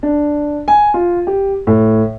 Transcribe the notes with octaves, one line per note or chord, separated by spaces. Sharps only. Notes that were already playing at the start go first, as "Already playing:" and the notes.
D4
G#5
F4
G4
A2